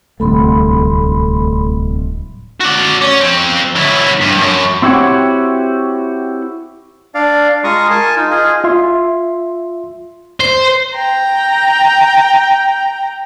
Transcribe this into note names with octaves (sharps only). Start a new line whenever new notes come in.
D1 C2 A3 A4 B5 C6
F#4 D5
C#4
F2 C4
F#3 E4
G2
F#2
C4 E4 F#4 G4 C#5 F#5
D4 D5 F5
G#3 F4 A#5 C6 C#6 D#6
A#4 G#5 A5
D#4 F4
F4 G#4 D#5
F4 E5 C6
C5
G5 A#5